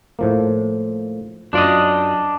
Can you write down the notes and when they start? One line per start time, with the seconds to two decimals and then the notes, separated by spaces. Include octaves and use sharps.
0.19 A2 F3 A#3
1.53 F#2 D4 F4 D5 D#5